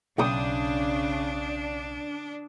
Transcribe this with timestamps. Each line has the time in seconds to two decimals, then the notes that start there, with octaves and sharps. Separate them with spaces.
0.18 B1 C#3 D4 G5 D#6